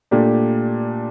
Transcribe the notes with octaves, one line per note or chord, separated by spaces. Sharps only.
A#2 A3 D4 G4